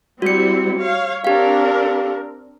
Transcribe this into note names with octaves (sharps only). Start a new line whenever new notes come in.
G3 C4 E4 F#4 C#7
C#5 F5
C4 D4 G4 A#4 F5